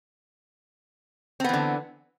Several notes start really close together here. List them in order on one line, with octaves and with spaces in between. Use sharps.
C4 B3 E3 D3